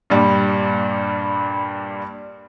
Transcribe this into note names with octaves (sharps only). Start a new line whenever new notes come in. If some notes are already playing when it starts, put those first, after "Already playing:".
G2 A#2 G3